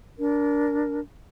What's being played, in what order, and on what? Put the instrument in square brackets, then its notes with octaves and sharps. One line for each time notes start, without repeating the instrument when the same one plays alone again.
[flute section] D4 A#4